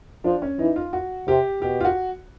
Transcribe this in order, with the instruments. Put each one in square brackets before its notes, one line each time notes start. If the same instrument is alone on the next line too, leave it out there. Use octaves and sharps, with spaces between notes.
[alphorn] F3 [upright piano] D4
[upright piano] C#4
[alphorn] E3 [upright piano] D#4
[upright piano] F4
F#4
[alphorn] C3 [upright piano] G4
[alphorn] B2 [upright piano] G4
[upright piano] F4
F#4